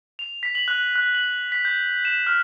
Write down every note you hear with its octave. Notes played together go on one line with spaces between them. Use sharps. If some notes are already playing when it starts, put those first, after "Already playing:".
F7
B6
F#7
F#6
F#6
F#7
B6
G6
E7
F6